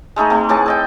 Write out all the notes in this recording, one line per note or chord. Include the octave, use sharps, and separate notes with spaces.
G#3 A3 D#4 G#4
A3 C4
A2 E3 G#4 A5
A4 D#5 G5